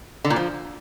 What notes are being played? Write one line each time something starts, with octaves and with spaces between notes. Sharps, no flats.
D3
A#2
F3